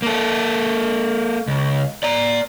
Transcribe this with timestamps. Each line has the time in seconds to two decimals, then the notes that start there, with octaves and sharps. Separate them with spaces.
0.02 A#3 A4
1.48 C#2
2.03 D5 A#5